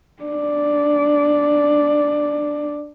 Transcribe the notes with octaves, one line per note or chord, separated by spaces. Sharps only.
D4 D5